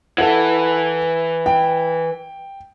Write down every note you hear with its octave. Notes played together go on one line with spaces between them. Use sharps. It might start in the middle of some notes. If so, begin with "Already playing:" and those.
E3 A4 F#5
G5